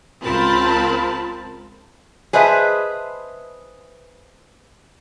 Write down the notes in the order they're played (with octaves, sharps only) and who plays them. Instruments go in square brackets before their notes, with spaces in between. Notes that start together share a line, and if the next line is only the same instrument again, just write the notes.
[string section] C#2 C4 F4 A#4 A5 B5
[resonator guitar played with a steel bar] G#4 B4 C5 D#5 E5 A5